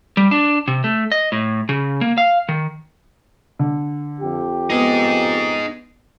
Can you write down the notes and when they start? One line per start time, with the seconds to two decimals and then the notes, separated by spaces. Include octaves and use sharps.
0.17 G3
0.31 D4
0.68 C3
0.84 A3
1.12 D#5
1.32 A2
1.69 C#3
2.01 A#3
2.18 F5
2.49 D#3
3.59 D3
4.20 F2 G4
4.70 B3 D#4 G#4